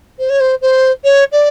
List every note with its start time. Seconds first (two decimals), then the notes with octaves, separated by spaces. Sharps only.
0.19 C5
0.30 C#5
0.40 C5
0.62 C5
1.04 C#5
1.32 D5